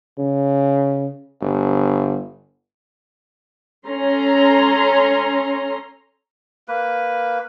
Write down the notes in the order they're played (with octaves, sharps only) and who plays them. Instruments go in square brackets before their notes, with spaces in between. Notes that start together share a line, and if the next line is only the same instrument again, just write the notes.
[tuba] C#3
G1
[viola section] C#4 A4 A#5 C6
[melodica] A#3 B4